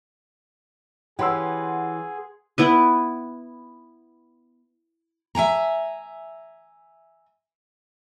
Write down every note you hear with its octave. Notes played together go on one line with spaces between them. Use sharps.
E3 C#4 G4 G#4 F#5 C6 E6
B3 E4 B4
E5 G5 G#5 A#5